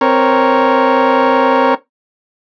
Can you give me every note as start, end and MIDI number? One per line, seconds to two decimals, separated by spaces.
0.01 1.74 60
0.01 1.74 70
0.01 1.74 73